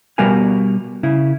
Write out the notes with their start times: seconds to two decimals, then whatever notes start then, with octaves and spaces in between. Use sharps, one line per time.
0.18 B2 G3 B3 A#4 F5 G#5
1.03 C#3 E4